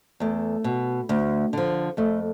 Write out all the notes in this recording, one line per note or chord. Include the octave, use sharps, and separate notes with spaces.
E2 A3
B2
D2
D3 F3
F2 A3